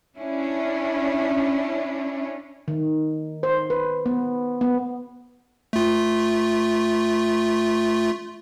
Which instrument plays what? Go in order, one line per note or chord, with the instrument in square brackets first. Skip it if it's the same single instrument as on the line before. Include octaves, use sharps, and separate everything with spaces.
[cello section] C#4 D4 E4
[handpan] D#3
C5
B4
B3
B3
[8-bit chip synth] A3 F4